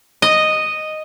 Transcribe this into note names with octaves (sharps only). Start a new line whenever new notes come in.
D#5